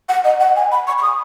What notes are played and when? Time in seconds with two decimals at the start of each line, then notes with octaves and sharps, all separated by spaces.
0.09 F#5
0.24 D#5
0.40 F#5
0.56 G#5
0.71 B5
0.87 C#6
0.98 C#6
1.02 D#6